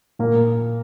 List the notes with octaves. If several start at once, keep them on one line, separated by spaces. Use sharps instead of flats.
A#2 A#3